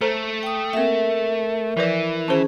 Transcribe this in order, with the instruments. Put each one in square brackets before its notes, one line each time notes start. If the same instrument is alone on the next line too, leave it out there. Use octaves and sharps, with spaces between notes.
[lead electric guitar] A3 [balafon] A4 C5 A#5
[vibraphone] G5 D#6
[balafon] A#3 C4 [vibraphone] A#4 E5
[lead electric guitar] E3 [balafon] F3 B4 D5
[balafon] D#3 C5 A5 [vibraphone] C#4 G#4